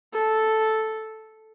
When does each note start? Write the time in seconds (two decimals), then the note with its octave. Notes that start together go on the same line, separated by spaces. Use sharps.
0.13 A4